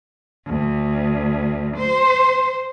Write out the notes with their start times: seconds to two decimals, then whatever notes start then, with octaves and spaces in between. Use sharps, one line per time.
0.45 D2
1.77 C5